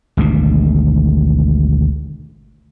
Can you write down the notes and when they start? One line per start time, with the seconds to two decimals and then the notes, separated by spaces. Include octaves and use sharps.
0.17 G#1 D2 B2